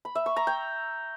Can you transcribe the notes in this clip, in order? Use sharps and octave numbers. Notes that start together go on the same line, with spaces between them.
B5
E5
C#6
A#5
G5